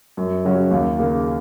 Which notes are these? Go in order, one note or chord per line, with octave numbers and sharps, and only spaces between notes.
F#2
C#3 F#3 C#4 F#4
D#2
C#3 A#3